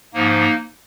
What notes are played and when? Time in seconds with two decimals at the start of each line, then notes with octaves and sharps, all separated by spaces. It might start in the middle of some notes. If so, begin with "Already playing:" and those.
0.14 G#2 F3 A#3 D#4